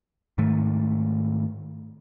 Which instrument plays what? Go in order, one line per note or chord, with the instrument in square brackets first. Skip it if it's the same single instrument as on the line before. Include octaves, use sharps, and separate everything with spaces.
[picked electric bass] G#2 D#3 A3